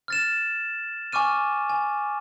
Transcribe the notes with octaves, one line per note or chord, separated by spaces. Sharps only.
F6 A6 E7
G#5 C#6 D6 F6 D#7
G#5